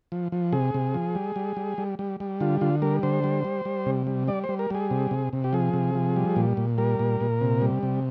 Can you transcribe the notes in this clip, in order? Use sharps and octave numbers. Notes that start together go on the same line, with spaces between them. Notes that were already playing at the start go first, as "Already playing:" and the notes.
F3
F3
C3 G#4
C3
F3
G3
G3
G3
G3
G3
G3
D3 F4
D3 F4
G3 A#4
D3 C5
G3
G3
G3
C3
G3
G3 D5
C5
G3
A#4
G3 G#4
C3
C3
C3
G4
F3 G#4
C3
F3
G3
A#2
A#2
G3 A#4
A#2
A#2
C3
G3
C3